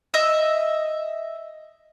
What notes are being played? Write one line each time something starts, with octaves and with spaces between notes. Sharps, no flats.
D#5 E5 E6